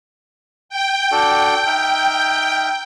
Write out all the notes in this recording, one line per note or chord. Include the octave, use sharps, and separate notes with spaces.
G5
D4 F#4 A4
D#4 E5 F6